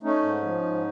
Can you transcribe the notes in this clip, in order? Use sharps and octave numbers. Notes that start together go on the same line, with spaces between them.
A3 C#4 D#4
G#2
F3
G#2